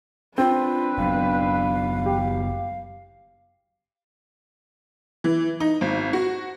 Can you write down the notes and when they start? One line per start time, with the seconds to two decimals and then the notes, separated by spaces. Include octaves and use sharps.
0.38 C4 D4 F4 B4
0.98 F#1 F#3 B3 F5
2.06 G4
5.24 E3
5.60 D#4
5.81 G#1
6.13 F#4